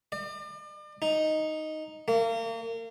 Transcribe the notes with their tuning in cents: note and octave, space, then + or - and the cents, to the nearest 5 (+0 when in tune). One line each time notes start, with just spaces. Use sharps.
D5 +40
D#4 +0
A#3 -35